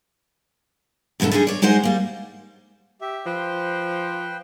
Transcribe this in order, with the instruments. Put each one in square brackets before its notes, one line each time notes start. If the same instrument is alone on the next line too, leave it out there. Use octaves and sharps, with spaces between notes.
[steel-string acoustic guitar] E2 G#2 B2 D3 A4
D3 G3 D#4 F#4 G#4
C#5 D5
G#3 D#4 G#4 C5 F#5
G3 A#3
[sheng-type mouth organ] G4 E5
[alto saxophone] F3 [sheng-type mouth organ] B4 C5 G5